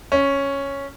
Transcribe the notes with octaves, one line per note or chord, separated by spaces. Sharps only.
C#4